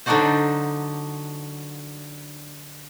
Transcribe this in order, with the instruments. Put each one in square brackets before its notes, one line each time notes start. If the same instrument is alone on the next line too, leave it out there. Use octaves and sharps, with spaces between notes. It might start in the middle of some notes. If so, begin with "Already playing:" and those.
[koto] D3 F#3 D4 D#4 F#4 C5